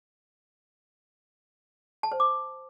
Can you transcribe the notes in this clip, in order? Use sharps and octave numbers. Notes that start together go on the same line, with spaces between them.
A5
C5
D6